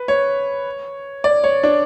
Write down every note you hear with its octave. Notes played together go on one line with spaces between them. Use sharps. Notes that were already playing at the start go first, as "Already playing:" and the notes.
Already playing: B4
C#5
D5
C#5
D4